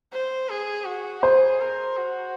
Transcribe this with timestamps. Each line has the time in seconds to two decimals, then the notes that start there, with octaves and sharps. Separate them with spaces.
0.12 C5
0.49 G#4
0.86 F#4
1.23 G#4 C5
1.60 A#4
1.97 F#4